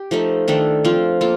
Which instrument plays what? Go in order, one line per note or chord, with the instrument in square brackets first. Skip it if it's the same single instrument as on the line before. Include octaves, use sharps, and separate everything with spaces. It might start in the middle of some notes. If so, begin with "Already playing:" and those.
Already playing: [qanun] G4
F3 A3 D#4 A4
D#3 A3 D4 A4
F3 C4 F4
A#3 F4 A4